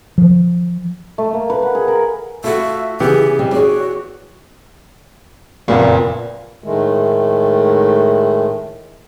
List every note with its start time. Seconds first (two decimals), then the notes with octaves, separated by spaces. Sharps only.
0.18 F3
1.18 A3
1.33 A#3
1.50 B4
1.63 F#5
1.75 G#4
1.88 A#4
2.44 A3 F4 F#4 E5
3.00 C#3 E3 B3 G4 G#4
3.39 F2 G3 C4
3.52 F#4 G#4 C#5 D5
5.68 F#1 F2 A#2 B3
6.64 A2 D#3 G#3 A3